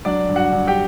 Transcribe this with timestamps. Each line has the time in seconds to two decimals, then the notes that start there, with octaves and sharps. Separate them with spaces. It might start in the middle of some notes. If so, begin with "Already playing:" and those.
0.05 F#3 D4 D5
0.29 G2
0.36 F#4 F#5
0.52 G2
0.67 G4 G5